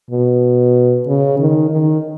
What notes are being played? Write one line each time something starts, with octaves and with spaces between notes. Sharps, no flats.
B2
C#3
D#3
D#3